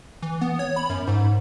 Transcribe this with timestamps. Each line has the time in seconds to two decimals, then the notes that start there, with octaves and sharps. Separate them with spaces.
0.22 E3
0.41 B3
0.59 C#5
0.76 B5
0.90 F#2
1.07 G#2